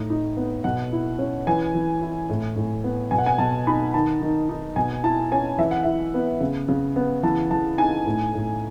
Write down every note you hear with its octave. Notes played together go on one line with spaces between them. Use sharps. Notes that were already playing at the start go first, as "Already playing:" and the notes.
Already playing: A2 D#4
D#4
B3
B2 F#5
E4
C#4
E3 G#5
E3
E4
A2
A2
B3
B2 G#5
F#5
G#5
B2 A5
D#4 B5
D#3 A5
D#3
D#4
B2 G#5
E4 A5
C#4 G#5
E3 E5
F#5
E4 E5
B3
C#3
C#3
B3
E3 A5
E3 A5
D#4 G#5
A2
A2